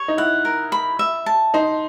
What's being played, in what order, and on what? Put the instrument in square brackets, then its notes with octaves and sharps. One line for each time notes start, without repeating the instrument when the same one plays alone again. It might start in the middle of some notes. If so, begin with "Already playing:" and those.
Already playing: [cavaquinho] C#5
[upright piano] D#4
[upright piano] E4 [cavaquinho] F#5
[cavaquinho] A#4
B5
E5
A5
[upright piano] D#4 [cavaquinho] C5